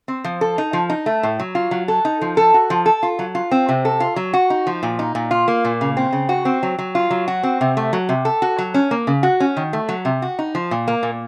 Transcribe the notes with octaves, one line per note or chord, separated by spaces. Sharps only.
C4
F3
A4
D#4
F3
D#4
A3
A2
F#3
F4
F#3
A4
D#4
F3
A4
F#4
F3
A4
F4
F#3
F4
C4
C3
A4
F4
F#3
F#4
D#4
F3
A#2
D#4
A#2
F4
A#3
A#2
C#3
C4
C#3
F#4
C4
F#3
F#3
F4
F#3
F#4
C4
C3
A3
F#3
C3
A4
F#4
F#3
C#4
A#3
C#3
F#4
C#4
D#3
A3
F#3
C3
F#4
D#4
F3
A#2
A#3
A#2